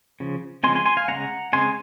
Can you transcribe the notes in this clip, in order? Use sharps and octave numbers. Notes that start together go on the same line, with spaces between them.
C#3 F3
C#3 F3 G#3 C4 G#5 C6
G#5 C6
G#5 C6
F5 G#5
C#3 G#3 C4 F#5 A#5
C#3 G#3 C4 G#5 C6